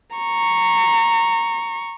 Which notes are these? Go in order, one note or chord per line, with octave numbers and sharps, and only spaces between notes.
A#5 C#6